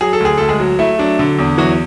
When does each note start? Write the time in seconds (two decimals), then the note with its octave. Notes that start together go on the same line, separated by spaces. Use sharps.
0.01 F#3 G#4
0.13 A4
0.20 D2 G#4
0.38 D2 A4
0.49 G#3 G#4
0.60 F#3
0.79 A3 E4
0.99 F#3 D4
1.19 D3
1.39 E2
1.58 E3 F#3 F#4